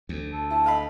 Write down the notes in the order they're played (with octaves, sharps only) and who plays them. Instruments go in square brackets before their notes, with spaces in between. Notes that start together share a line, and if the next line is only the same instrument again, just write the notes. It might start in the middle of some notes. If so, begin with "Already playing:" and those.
[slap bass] D2
[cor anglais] A4
[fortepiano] E4 [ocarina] A5
[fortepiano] D#5 F5 B5